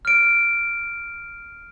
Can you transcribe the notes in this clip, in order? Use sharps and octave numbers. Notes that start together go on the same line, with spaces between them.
F6 D7